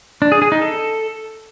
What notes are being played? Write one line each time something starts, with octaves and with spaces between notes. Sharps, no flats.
D4
G#4
G#4
D#4
A4